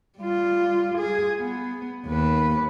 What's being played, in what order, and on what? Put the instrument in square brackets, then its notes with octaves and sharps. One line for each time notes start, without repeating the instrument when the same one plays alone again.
[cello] G3 F4
G#4
B3
D#2 B4